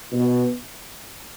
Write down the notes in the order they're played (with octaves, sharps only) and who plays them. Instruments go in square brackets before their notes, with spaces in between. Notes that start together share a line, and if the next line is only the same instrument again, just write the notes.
[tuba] B2